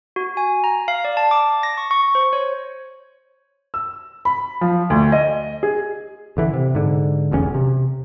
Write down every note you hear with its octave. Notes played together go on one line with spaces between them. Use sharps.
F#4
G#5
A#5
F5
D5
A5
D6
A#6
C#6
C#6
C5
C#5
E6
B5
F3
D2
D#5
G#4
A1 D3 E3
C3
G#2 D3
F1 B1 E2 C#4
C3